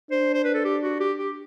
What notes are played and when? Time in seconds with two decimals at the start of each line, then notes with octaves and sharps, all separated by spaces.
0.11 D4 C5
0.34 C5
0.44 B4
0.54 A4
0.65 G4
0.83 F#4
1.00 G4
1.18 G4